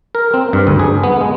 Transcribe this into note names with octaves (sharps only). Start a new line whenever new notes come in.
A#4
C4
G2
D2
G#4
B3
G#3